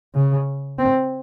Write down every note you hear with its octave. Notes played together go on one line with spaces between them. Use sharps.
C#3
C4